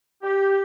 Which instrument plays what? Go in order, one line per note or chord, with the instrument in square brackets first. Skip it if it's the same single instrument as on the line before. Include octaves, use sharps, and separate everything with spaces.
[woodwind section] G4